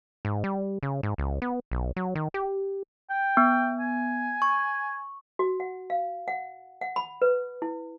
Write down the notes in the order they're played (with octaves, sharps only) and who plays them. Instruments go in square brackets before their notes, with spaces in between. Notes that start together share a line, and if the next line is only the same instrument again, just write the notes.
[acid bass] G#2
G3
C#3
G#2
C#2
B3
B1
F#3
D#3
G4
[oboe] G5
[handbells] B3
[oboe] G#5
[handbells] C#6
[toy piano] F#4
F#5
F5
F#5
F#5
B5
B4
E4